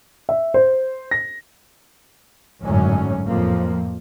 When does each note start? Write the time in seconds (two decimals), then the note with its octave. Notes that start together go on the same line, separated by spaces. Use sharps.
0.29 E5
0.54 C5
1.11 A#6
2.64 G#1 F#2 A2 D3 F#3 C#4
3.27 F2 A2 F3 A#3